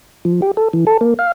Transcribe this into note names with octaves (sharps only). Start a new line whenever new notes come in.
F3
G4
A4
E3
A4
A#3
F5